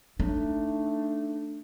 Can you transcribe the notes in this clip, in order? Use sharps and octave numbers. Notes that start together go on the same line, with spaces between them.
A3 D4 D#4